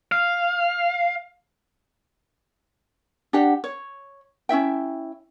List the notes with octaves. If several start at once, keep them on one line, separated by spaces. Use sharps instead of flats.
F5
D4 G4 F#5
C#5
C#4 E4 E5 G5